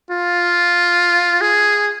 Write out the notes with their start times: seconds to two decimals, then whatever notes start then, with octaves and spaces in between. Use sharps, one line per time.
0.11 F4
1.41 G#4